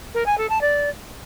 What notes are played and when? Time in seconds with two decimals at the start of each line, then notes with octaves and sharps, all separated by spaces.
0.14 A#4
0.26 G#5
0.38 A4
0.49 A5
0.61 D5